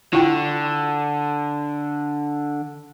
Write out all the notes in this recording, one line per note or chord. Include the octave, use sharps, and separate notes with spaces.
D3 E4 F4 G5